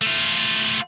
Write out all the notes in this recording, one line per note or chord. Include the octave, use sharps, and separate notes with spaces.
A3 F4